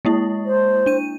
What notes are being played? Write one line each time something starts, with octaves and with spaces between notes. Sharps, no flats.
G#3 A#3 E4
C5
D4 D#7